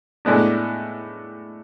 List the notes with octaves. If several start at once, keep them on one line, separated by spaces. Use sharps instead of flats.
A2 G#3 B3 D4